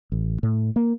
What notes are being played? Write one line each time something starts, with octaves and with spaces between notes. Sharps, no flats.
A1
A2
A#3